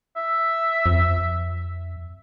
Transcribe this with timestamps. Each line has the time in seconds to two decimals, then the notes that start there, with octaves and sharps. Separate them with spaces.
0.17 E5
0.86 F2